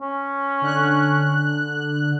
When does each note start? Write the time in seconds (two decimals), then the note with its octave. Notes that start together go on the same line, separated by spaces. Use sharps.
0.01 C#4
0.62 D3 F#6